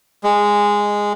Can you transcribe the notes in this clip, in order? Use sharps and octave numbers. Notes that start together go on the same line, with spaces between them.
G#3